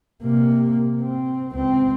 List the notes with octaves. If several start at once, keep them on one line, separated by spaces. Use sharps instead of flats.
C3 A#3
C4
C#2 C4